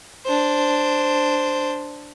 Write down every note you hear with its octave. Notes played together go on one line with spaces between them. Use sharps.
D4 C5